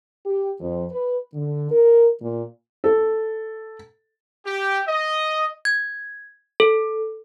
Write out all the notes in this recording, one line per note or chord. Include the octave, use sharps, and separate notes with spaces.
G4
F2
B4
D3
A#4
A#2
A4
G4
D#5
G#6
A4